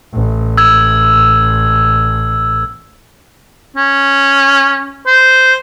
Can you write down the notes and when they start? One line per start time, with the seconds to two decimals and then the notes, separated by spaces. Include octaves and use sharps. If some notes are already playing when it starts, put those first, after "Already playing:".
0.14 A1
0.58 E6 G#6
3.77 C#4
5.07 C5